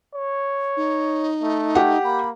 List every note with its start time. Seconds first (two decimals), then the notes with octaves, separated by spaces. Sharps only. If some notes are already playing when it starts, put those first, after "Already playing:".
0.14 C#5
0.77 D#4
1.42 A3
1.75 G4 F#5
2.04 A#3 B5